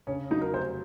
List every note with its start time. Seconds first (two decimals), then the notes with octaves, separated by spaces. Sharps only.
0.07 C#3 C#4
0.31 F#3 D#4
0.42 A#4
0.53 F1 C5